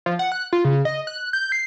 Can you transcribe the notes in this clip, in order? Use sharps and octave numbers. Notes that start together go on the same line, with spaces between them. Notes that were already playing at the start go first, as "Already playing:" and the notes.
F3
F#5
F#6
F4
C#3
D#5
F#6
G6
C7